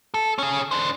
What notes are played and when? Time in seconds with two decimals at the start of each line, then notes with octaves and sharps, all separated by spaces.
0.14 A4
0.38 C#4 G#4
0.71 D4 C5